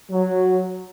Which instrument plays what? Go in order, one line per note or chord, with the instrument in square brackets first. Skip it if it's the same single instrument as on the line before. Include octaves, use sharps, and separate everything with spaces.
[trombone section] F#3